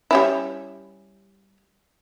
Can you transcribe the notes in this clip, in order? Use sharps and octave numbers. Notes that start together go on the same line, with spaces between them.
G3 C#4 E4